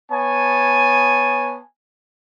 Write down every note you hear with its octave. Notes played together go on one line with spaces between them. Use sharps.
B3 C#5 G#5 A5